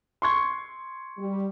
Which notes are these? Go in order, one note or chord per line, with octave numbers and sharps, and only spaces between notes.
C6 C#6 G#6
G3